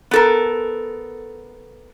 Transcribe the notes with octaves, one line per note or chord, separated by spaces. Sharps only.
B3 A4 A#4